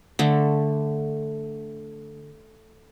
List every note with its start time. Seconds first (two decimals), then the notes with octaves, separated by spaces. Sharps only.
0.19 D3 A3